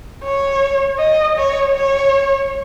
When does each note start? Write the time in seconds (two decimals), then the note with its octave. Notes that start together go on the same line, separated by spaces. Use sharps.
0.24 C#5
0.99 D#5
1.37 C#5
1.75 C#5